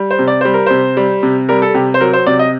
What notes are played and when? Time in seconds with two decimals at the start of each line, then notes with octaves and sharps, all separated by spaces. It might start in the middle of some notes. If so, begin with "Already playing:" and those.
Already playing: G3
0.11 C5
0.19 C3
0.28 D5
0.41 G3 C5
0.54 A#4
0.66 C3 C5
0.97 G3
1.23 C3
1.49 G3 A#4
1.62 A4
1.74 C3 G4
1.94 C5
2.01 F#3 A#4
2.13 C5
2.26 C3 D5
2.39 D#5